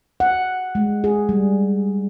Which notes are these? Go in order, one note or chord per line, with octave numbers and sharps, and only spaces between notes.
F#5
G#3
G#4
G3